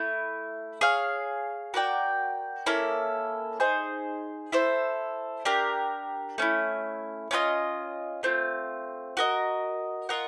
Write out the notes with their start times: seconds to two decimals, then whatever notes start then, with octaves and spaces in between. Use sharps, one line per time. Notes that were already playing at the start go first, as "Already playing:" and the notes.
Already playing: A3 E4
0.81 G#4 C#5 F5
1.74 F#4 A#4 D5 G5
2.66 A#3 C#4 E4 A4
3.60 D#4 G#4 C5
4.52 E4 A4 C5
5.45 D4 G4 A#4
6.38 A3 C#4 E4
7.31 C#4 F4 A#4 D#5
8.23 A3 C4 F4
9.17 F#4 A#4 D#5
10.09 F4 A#4 D#5 F#5